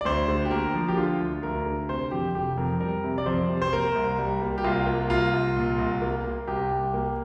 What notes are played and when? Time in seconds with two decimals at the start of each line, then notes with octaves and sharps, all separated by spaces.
0.01 D5
0.05 D2 C5
0.28 D3
0.45 G4
0.51 A#3 A#4
0.74 F3
0.88 G4
0.97 D3 F4
1.20 D2
1.43 D2 A#4
1.66 D3
1.89 C3 C5
2.11 F2 G4
2.35 F1 G4
2.57 F2 A#4
2.80 G3 A#4
3.04 C3
3.18 D5
3.26 F2 C5
3.49 C3
3.62 C5
3.73 A#3 A#4
3.96 C2
4.19 G3
4.42 A#3
4.58 G4
4.64 C2 F4
4.87 A#3
5.10 C2 F4
5.34 C2
5.56 A#2
5.78 C2
6.02 A#3
6.24 A#3
6.48 C2 G4
6.71 C2
6.94 A#3